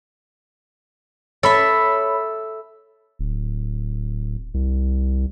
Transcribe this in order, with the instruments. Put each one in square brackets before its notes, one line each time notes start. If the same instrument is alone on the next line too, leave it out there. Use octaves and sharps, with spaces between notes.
[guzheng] A4 E5 [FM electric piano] C#5 B5
[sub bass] D1
C2